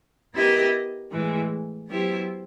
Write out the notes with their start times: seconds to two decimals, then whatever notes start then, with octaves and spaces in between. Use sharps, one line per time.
0.34 B3 E4 G4 A#4 D#5
1.11 A2 E3 G#3
1.88 F#3 B3 E4 G4 C5